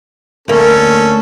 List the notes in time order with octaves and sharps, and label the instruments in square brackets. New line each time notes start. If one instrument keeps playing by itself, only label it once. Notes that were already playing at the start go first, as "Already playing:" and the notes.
[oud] D2 A#3 [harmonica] C#4 A4